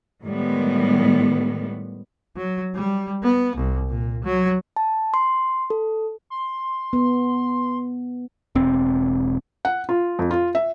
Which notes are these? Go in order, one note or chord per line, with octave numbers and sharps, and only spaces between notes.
A2 D#3 G3 G#3 B3
F#3
G3
B3
C2
A#2
F#3
A5
C6
A4
C6
B3
E1 C4
F#5
F4
F2
F4
E5